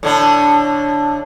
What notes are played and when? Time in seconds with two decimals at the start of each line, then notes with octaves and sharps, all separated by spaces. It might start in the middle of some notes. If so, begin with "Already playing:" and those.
0.03 A2 D3 D4